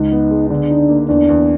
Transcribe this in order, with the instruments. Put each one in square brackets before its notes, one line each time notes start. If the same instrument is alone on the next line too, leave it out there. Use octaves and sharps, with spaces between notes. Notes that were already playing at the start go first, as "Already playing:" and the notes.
Already playing: [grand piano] C#2 [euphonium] D#4
[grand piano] B3
G#3
[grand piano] D3 [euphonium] D4
[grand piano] D#4
A#3
[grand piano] E2 [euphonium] D4
[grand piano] E2